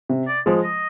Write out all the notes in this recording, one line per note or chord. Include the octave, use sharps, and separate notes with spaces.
C3
D5
F3 G#3
D#5